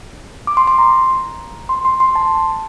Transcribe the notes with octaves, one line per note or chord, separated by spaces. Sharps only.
D6
C6
C6
A#5
C6
C6
C6
A5